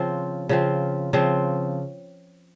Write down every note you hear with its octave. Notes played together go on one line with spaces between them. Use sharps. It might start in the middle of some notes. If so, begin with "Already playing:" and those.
Already playing: C#3 F3 C4
C#3 F3 C4
C#3 F3 C4